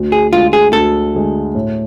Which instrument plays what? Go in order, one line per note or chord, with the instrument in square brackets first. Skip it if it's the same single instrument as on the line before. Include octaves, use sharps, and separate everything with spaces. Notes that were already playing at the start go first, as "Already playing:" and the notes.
Already playing: [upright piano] D2
[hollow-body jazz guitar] G#4
[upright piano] D3 G#3 [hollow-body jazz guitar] F4
[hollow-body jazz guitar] G#4
[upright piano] D2 [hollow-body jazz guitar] A4
[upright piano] D3 G#3
A2